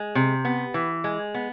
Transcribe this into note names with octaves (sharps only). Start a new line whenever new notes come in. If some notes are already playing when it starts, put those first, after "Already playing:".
Already playing: G#3
C3
B3
E3
G#3
B3